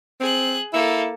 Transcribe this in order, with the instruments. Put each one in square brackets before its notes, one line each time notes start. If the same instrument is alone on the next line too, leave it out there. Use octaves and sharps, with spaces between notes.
[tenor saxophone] C4 [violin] G#4 F#6
[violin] A#3 A4 [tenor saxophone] E4